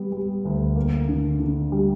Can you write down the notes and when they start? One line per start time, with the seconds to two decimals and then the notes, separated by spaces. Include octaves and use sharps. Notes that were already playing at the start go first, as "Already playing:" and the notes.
Already playing: G3 B3
0.12 G3
0.45 D2
0.76 A#3
1.09 D3
1.40 D3
1.72 G3